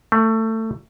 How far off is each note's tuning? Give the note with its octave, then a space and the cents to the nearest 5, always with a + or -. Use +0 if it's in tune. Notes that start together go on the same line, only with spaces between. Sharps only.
A3 +20